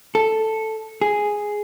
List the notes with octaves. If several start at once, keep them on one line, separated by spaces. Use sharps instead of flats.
A4
G#4